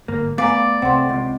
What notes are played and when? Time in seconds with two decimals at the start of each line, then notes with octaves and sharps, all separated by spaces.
0.08 G1 G#2 A#3
0.38 A3 B3 D5 F5 G#5 A#5
0.82 C2 A3 C4 F#5 C6
1.09 C#2 C3